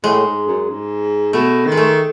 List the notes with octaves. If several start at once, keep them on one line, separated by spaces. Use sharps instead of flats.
A2 G#3
G#2
F#2
G#2
B2 A3
D#3
G#3
A3